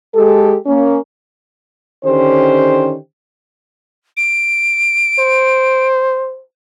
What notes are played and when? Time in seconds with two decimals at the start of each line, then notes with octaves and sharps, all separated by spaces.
0.14 G#3 G4 A4
0.66 A#3 C#4
2.04 D3 D#3 C#4 G4 C5
4.17 D7
5.19 C5